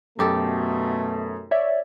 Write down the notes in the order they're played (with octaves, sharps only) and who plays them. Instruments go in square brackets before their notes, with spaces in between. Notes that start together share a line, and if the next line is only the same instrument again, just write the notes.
[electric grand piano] F#2 [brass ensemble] B2 A3 [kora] D#4 G4 A4
[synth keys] C#5 D5 E5